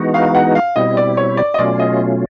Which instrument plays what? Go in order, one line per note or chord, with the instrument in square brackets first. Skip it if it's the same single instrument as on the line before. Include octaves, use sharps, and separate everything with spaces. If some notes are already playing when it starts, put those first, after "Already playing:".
Already playing: [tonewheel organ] E3 G#3 B3 D#4 F#4
[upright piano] F5
F#5
F5
[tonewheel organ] B2 G3 C4 E4 [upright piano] D#5
[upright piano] D5
C#5
D5
D#5
[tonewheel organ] B2 F#3 A3 C#4 F4 [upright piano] D5
[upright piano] D#5